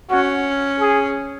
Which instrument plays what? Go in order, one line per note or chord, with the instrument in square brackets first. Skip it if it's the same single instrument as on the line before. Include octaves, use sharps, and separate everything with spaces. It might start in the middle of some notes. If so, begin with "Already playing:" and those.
[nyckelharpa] C#4 [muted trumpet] F#4
[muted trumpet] G#4